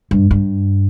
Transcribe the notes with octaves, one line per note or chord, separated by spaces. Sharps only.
G2
G2